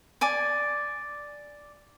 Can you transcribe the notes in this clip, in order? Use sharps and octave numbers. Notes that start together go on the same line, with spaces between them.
D5 G#5 D6